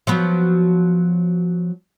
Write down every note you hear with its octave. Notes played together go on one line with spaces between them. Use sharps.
F3 F#3 B3